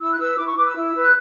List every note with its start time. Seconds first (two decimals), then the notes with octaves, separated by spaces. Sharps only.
0.01 E4 E6
0.11 F#6
0.19 B4 E6
0.38 E4 D6
0.47 C#6
0.56 B4 D6
0.66 E6
0.75 E4
0.95 B4
1.03 F#6